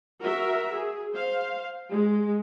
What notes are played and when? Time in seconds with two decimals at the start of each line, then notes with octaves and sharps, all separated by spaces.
0.21 F#4 A#4 E5
0.75 G#4
1.14 C5 F5
1.90 G#3